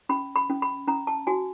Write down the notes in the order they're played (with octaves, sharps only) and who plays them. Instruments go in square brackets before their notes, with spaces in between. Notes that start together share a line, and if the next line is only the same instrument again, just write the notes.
[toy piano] C#4 B5
B5
C#4
B5
C#4 A#5
A5
F#4 G#5